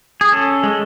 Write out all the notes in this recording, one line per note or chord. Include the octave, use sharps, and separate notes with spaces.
G#4
C#4 A4
G#3